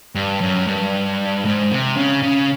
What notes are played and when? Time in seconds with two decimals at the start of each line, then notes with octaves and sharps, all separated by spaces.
0.15 G2
0.41 F#2
0.67 G2
1.45 G#2
1.72 C3
1.97 C#3
2.23 C#3